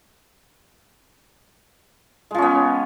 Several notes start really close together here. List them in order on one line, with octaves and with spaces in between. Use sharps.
G#3 F3 C#4 B3